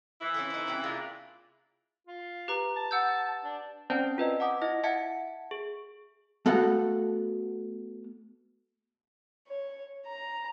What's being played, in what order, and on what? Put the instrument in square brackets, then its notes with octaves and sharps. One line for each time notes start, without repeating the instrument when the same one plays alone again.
[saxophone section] E3 [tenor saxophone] E4
[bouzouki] C#4 F4 A4
D#4 C5
C3 C#4 G5
[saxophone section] A#2 G#3 D4 [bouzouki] F4 G#4
[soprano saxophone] F4
[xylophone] G4 B4 A#5
[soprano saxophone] A5
[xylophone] F#5 E6 G6
[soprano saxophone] D4
[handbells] C4 C#4 C5 D5 G5 A5
F4 B4 D#5
F#5 A5 D6 D#6
E4 D#5 A#6
E5 F#5 A5 G#6 C#7
G#4
[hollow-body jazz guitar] A3 B3 F#4 A4 F5 F#5
[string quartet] C#5
A#5